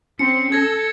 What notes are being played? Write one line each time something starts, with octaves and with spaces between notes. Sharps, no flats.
C4 C#4 C#7
A4 G#6 A#6